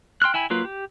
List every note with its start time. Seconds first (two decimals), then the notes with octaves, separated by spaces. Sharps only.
0.22 G5 C6 F6 F#6
0.34 E4 G5 G#5 B5
0.50 F#3 A#3 F4 B4
0.65 G4